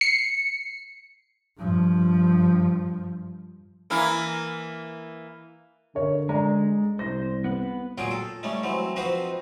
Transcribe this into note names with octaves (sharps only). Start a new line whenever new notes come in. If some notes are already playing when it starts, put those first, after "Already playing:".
C7 C#7
G2 F3
E3 A#3 E4
D3 A#4 C#5
G#3 D5 A#5
C2 C5 A#6
B3 B4
A#2 F#3 F4 G#4 G5
A4
G3 A3 C#4 D#4
E3 F#3 C4
F3 C4 D#4 F#4 B4 C5